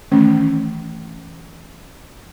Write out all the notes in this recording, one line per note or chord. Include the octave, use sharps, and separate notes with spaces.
D#3 E3 A3 C#4